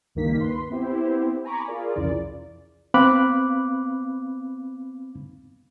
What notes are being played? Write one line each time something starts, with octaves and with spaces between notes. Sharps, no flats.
C#2 G2 D#3 A#3 D#4 B6
B4 C6
B3 C4 E4 G4 C5
G#5 A#5 B5 C#6 D6
F4 G#4 A#4 D5
C2 F2 C#3 E3 D5
B3 C4 F5 B5 D6 F#6